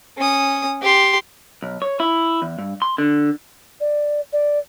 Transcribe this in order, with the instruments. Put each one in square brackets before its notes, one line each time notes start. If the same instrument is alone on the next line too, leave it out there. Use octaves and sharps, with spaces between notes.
[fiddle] C#4 D#6
G4 C6
[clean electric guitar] B1
C#5
E4
E2
G2
C6
D3
[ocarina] D5
D5